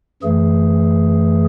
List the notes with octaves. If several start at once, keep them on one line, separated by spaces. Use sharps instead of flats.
F#2 E3 A3 G#4